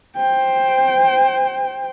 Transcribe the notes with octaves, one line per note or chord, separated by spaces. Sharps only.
C5 G5